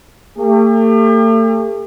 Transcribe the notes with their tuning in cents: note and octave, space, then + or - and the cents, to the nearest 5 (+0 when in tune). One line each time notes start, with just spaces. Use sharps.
A3 +40 G4 +45